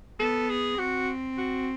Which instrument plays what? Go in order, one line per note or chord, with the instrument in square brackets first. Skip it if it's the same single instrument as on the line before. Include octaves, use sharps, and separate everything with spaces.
[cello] B3 [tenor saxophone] A4
[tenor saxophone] G#4
[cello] C4 [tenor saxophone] F#4
[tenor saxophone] F#4